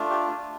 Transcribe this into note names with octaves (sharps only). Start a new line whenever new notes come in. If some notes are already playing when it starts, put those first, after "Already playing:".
Already playing: A3 D4 F4
G4